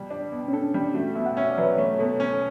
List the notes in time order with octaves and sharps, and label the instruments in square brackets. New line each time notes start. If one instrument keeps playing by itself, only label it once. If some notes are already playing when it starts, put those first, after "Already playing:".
Already playing: [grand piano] B2 G3
D4
B2
[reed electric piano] C#4
[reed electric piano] D4 [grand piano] A4
[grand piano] G3
[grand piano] A3 [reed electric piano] F#4
[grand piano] B2 [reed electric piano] E5
[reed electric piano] F#5
[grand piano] C#4 [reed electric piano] E5
[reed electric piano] D5
[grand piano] F#3 [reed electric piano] B4
[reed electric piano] C#5
[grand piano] A3 [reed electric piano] C#5
[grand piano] B2 [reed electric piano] A4
[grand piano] C#4 [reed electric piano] C#5